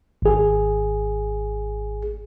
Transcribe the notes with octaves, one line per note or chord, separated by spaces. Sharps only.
G#1 G#4